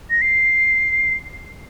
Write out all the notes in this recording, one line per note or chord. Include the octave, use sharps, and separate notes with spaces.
A#6
C7